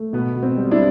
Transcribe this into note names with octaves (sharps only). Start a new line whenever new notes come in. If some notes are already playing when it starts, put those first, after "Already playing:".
Already playing: A3
B2 B3
B2
C4
G3
D4 E4